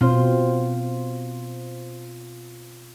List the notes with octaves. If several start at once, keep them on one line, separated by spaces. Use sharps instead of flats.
B2 C4 F4 C5